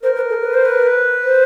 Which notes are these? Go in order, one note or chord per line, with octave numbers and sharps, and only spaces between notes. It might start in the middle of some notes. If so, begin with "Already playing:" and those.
A#4 C5
B4
A4
B4
C5
B4
B4
C5